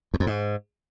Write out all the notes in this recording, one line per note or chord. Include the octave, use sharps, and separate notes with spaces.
E2
F2
G#2